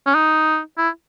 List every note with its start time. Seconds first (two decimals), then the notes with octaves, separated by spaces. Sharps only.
0.06 C#4
0.15 D#4
0.78 E4